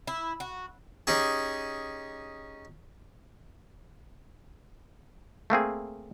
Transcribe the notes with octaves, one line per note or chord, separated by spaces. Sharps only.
E4
F#4
C#4 D#4 G4 G#4
A3 A#3 C4 G#4